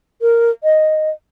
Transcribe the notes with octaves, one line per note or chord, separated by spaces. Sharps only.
A#4
D#5